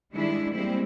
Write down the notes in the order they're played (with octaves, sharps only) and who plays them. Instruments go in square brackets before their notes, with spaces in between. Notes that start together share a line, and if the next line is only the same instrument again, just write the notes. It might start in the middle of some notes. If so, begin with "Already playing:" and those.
[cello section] D#3 G3 G#3 D4 E4
G3 G#3 A#3 C4 E4